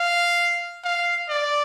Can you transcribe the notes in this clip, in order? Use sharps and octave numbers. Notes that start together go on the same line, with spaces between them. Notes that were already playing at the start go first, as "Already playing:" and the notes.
Already playing: F5
F5
D5